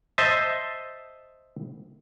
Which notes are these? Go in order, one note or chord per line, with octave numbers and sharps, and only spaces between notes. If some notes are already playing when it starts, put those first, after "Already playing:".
C5 D#5 E5 A5